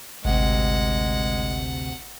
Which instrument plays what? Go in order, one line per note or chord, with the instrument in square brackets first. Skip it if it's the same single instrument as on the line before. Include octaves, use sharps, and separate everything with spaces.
[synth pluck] G#1 [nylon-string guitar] D2 C3 [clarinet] G#3 [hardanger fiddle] F#5